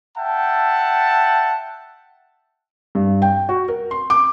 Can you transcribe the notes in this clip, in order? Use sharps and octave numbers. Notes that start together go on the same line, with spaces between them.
E5 F#5 G5 A5
G2
G5
F#4
A#4
C6
D6